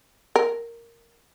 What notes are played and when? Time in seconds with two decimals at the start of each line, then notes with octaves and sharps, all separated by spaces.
0.36 A#4